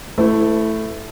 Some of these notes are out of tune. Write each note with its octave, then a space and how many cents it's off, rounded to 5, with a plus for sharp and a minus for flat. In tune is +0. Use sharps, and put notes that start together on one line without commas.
A3 +0 E4 +0 B4 +40